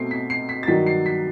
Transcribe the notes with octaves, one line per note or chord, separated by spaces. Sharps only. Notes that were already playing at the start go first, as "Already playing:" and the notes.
Already playing: B2 A3 C4 C7
B6
C7
B6
A6
G2 D#3 F#3 B6
C7
B6